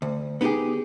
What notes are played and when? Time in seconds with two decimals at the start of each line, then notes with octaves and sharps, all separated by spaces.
0.02 D2
0.41 B3 D#4 E4 G4 G#4